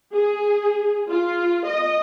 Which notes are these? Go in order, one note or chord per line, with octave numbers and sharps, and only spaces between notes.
G#4
F4
D#5